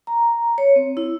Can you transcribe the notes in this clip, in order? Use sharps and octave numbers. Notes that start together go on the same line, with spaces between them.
A#5
C#5
C4
E4